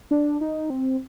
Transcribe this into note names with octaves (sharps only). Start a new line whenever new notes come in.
D4
D#4
C4